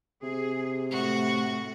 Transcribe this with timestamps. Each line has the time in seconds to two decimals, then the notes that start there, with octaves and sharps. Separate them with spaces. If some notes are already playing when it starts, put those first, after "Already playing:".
0.23 C3 G#4
0.91 A2 F#4